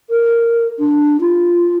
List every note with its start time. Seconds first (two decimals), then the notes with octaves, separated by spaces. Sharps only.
0.10 A#4
0.79 D4
1.21 F4